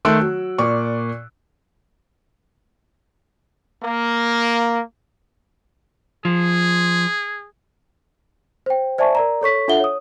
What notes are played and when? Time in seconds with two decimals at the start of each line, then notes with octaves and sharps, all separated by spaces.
0.05 D#3 A3 C6 E6 F#6 D7
0.21 F#3
0.58 A#2 D5 C#6
3.83 A#3
6.25 F3 G#4
8.66 C5 G5
8.98 C5 D5 E5 G#5 A5 C#6
9.15 A#4 D5 A#5
9.41 A4 C#5 C#6 B6
9.68 D4 F4 A4 E5 F#5 G7
9.80 C#5 D#6